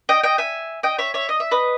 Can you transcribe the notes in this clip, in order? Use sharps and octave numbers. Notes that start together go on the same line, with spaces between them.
D#5 G5
D#5 G5
E5 G#5
D#5 G5
C#5 E5
C#5 E5
D#5
E5
B4 D#5